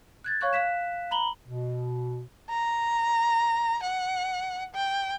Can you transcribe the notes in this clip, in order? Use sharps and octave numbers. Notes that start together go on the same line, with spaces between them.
F#6 G#6 A6
C#5 F5 C#6 F#6 G#6
F5 F#6 B6 E7
A#5 B5 F#7 G7
B2
A#5
F#5
G5